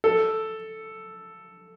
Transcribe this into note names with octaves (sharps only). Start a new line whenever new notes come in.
A4